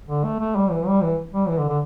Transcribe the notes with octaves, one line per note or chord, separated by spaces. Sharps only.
D3
A3
A3
G3
E3
G3
E3
G3
E3
D3
D3